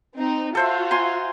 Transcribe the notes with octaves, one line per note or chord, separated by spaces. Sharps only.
C4 D#4
F4 F#4 A4 C5 E5
G#5 A#5 C6